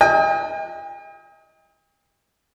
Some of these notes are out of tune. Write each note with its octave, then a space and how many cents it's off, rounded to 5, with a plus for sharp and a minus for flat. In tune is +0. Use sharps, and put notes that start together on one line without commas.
D#5 +30 G5 +45